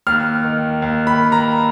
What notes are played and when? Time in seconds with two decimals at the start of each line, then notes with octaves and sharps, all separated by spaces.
0.07 D#2 F6
0.44 D#3
0.82 D#2
1.07 B5
1.19 D#3
1.32 A#5